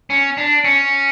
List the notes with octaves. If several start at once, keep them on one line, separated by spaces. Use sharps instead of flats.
C#4
D4
C#4